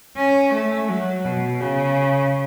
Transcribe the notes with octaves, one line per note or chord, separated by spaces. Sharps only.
C#4
A3
F#3
B2
C#3